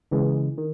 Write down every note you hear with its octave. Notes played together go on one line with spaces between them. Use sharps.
C#3 E3 G#3
D#3